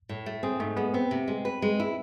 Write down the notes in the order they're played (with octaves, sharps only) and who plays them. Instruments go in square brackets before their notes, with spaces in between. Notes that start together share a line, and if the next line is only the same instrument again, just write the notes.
[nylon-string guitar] A2
A3
[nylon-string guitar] C4 [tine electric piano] G#4
[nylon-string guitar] G#2 [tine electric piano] A3
[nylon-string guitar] G#3 [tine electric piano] B3
[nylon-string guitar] B3 [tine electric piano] C4
[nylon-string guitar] C3
G#3
B4
G#3
E4